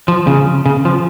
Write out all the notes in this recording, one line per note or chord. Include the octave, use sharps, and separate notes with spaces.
F3
C#3
C#3
F3